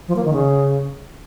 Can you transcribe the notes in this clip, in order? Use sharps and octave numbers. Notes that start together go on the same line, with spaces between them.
F3
A#3
D#3
C#3